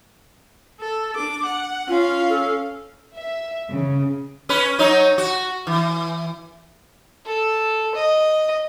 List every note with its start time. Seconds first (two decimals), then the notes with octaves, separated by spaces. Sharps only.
0.80 A4
1.15 D4 D6
1.45 F#5
1.89 C#4 F4 F5
2.29 A4
3.16 E5
3.70 C#3
4.49 C#4 B4
4.79 F#3 D#4 C#5
5.18 F#4
5.67 E3
7.26 A4
7.95 D#5